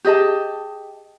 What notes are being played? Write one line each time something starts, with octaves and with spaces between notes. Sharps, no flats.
G4 G#4 D#5 A5